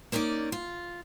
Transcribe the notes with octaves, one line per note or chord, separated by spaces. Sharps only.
A#3 C#4 D#4 E4 D5
F4